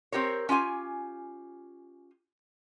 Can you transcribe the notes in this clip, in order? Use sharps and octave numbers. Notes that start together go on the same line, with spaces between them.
C4 G4 A#4 C#5
C#4 F4 G4 G#5